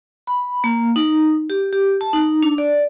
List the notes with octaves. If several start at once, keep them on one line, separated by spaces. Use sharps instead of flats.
B5
A#3
D#4
G4
G4
A5
D#4
D4
D5